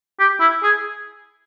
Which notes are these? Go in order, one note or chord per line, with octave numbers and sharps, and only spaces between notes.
G4
E4
G#4